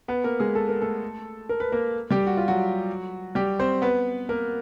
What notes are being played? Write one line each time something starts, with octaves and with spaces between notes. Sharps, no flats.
B3 B4
A#3 A#4
G#3 G#4
A4
A#4
A3 A4
A#4
B4
A#3 A#4
G3 G4
F#4
F4
F#3 F#4
G3 G4
C4 C5
B3 B4
A#3 A#4